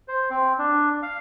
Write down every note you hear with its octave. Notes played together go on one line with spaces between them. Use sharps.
C5
C4
D4
F5